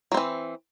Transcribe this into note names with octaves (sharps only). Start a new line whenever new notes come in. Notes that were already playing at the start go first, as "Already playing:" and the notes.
E3 F#3 C4